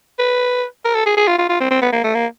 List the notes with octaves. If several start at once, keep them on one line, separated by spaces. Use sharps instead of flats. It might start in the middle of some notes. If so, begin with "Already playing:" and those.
B4
A#4
A4
G#4
G#4
F4
F4
F4
C4
C4
B3
A#3
A3
A#3